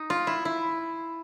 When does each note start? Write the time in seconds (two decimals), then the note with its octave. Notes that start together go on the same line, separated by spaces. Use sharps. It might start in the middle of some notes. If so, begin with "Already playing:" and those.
Already playing: D#4
0.10 F4
0.27 E4
0.45 E4